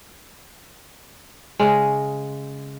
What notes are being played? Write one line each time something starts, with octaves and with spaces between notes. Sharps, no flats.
C#3 G#3